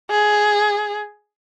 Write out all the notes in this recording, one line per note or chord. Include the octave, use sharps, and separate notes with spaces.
G#4